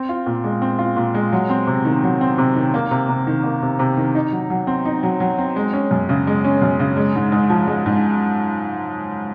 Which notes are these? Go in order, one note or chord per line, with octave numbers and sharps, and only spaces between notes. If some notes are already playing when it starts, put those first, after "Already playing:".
Already playing: C4
F4
A#2
G#3
C4
F4
A#2
G#3
F#3
C4
C3
D#3
F#3
C4
C3
D#3
A#3
C3
C3
D#3
A#3
C3
C3
D#3
D#4
F#3
F#3
C4
D#4
F#3
F#3
C4
G#3
C#4
F#2
C#3
G#3
C#4
F#2
C#3
G#3
G#2
G#2
F3
G#3
G#2